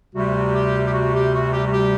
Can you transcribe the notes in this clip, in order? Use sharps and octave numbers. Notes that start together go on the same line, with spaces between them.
D2 C3 G3 F#4
G4
G4
F#4
G4
F#4
G4
F#4
G4